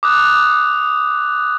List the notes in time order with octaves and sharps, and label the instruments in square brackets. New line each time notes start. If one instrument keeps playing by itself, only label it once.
[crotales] D6 D#6 F#6